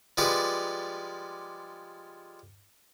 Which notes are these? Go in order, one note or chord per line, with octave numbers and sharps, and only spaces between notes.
F3 G3 G#3 F4 B4 D5